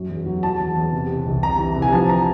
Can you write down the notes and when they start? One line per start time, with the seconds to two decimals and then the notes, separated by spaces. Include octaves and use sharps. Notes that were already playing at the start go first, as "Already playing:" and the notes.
Already playing: F#2 F#3
0.09 E2
0.26 F#3
0.43 F#3 A5
0.60 E2
0.76 E2
0.93 C3
1.09 C3
1.26 C2
1.43 C3 A#5
1.59 E3
1.76 C3
1.82 G#5
1.92 F3 A5
2.09 A#5